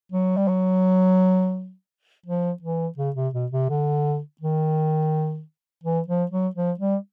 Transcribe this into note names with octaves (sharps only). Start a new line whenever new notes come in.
F#3
G3
F#3
F3
E3
C#3
C3
B2
C3
D3
D#3
E3
F3
F#3
F3
G3